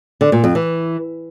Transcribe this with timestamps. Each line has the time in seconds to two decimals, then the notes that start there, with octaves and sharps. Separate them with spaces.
0.21 D3
0.32 A#2
0.44 F2
0.55 E3